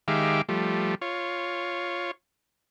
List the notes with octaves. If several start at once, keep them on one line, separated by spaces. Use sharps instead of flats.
D#3 G#3 G4 E5 F5 D6
F3 G3 A3
F4 C#5